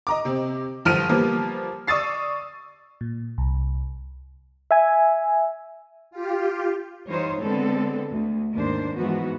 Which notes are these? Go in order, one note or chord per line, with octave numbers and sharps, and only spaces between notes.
D#5 A#5 D6
C3 C4
G1 F3 F6 D7 D#7
F3 G3 A#3 B3
D5 C#6 D#6 E6 A6 C7
A#2
C2
E5 G#5
F4 G4
E3 G3 D#4 F4 C5 C#5
D3 G#3 B3 C4 A4
D2
D#2 G#2 D4 C5
G#2 E3 F3 B3 F#4